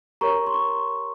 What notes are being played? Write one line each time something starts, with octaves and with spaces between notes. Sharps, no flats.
G4 A#4 C#5 A#5 C#6
C6
C#6